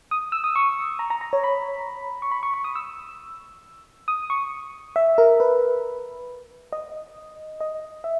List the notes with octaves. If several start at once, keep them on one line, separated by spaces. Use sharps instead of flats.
D#6
E6
D#6
C#6
A#5
A#5
A#5
C#5
B5
C#6
B5
C#6
C#6
D#6
E6
D#6
C#6
E5
A#4
B4
D#5
D#5
E5